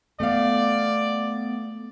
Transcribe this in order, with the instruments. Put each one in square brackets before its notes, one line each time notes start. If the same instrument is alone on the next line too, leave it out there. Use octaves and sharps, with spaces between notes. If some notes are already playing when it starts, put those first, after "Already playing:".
[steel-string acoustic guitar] A3 F5 [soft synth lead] B3 [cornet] D5